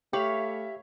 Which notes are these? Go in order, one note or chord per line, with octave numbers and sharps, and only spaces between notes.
A3 G4 C#5 E5 F5 B5